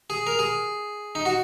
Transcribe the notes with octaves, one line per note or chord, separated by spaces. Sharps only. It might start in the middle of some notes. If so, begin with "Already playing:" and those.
G#4
A#4
G#4
D#4
F#4